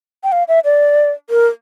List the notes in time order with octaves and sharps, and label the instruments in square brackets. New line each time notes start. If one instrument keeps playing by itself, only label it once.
[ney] G5
F5
E5
D5
A#4